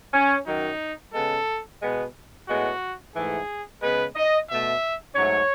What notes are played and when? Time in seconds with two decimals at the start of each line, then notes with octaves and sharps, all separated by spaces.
0.14 C#4
0.47 F#2 D#3 F#3 D#4
1.13 C#3 G#3 B3 A4
1.82 B2 G#3 B3
2.48 A2 G#3 B3 F#4
3.15 G#2 E3 A3 G#4
3.82 C#3 G#3 B3 B4
4.16 D#5
4.49 B2 A3 E5
5.16 G#2 F#3 A3 C#5